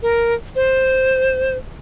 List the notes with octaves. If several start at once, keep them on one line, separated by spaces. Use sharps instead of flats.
A#4
C5